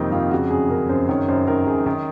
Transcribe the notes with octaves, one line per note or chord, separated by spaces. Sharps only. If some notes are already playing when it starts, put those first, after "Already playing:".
Already playing: F2 C3 D#3 A#3 C4 D#4
F2 F4
C#3 F#4
F#2 G#4
C#3 A#4
F#2 C5
D#3 C#5
F#2 C5
D#3 A#4
F#2 G#4
D#3